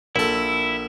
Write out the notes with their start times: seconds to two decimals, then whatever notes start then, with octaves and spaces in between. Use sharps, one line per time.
0.16 A#1 E4 A4